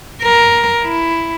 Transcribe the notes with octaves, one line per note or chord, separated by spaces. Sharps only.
A#4
E4